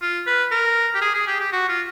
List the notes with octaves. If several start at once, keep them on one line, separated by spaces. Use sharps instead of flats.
F4
B4
A#4
G4
G#4
G#4
G4
G4
F#4
F4